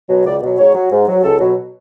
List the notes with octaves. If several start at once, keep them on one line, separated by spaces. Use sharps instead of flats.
B2 F#3
C#2 D5
B2 F#3
G#2 C#5
F#3
G#2
F#3
C#2 A4
B2 F#3